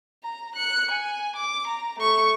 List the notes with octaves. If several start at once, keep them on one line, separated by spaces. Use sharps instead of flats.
A#5
F#6 C#7
G#5
D6
A#5
A3 C#6